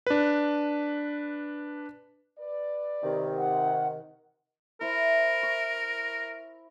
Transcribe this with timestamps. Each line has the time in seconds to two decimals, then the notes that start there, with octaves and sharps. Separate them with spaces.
0.07 D4 B4
2.39 B4 D5
3.03 C3 D#3
3.37 F#5
4.81 E4 A#4 C5
5.43 C#6